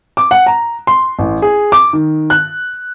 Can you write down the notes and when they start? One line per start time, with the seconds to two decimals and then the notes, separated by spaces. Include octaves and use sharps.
0.17 D6
0.31 F#5
0.46 A#5
0.87 C6
1.19 A1
1.42 G#4
1.72 D6
1.93 D#3
2.30 F#6